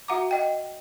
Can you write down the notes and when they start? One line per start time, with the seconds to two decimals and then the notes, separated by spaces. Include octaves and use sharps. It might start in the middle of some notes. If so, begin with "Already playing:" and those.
0.08 F#4 E5 F#5 A#5 D6
0.31 D#5 G5